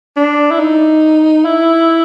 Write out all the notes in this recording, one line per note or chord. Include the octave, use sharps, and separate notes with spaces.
D4
E4
D#4
E4